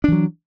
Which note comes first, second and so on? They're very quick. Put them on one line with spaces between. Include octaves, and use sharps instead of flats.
D4 E3 F#3